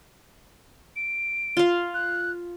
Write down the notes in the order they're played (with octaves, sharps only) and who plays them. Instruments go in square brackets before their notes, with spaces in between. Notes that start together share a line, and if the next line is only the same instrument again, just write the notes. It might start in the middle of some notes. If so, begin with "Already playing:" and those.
[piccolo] D7
[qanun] F4 F5
[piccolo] F#6